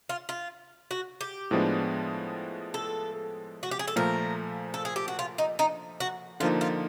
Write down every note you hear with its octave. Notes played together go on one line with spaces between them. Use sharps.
F4
F4
F#4
G4
A2 F3 G#3 B3 D4
A4
F#4
G4
G#4
A4
A#2 F3 A3 A#4
A4
G#4
G4
F#4
F4
D#4
D#4
F#4
D3 F3 A#3 D#4 F4
F4